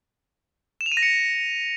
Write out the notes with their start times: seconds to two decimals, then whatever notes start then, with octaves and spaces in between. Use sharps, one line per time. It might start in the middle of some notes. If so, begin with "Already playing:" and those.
0.81 E7
0.86 F7
0.92 D#7
0.97 A#6
1.03 C#7